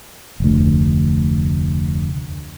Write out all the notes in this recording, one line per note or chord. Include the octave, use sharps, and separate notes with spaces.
F1 D2